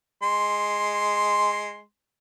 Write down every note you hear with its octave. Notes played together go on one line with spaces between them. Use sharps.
G#3 C6